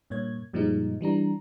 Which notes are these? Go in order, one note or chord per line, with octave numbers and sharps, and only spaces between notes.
G2 A#2 A#3 C#5 G#6
F#2 A#2 F3 G3 G#3 D#4
E3 G3 D4 A#5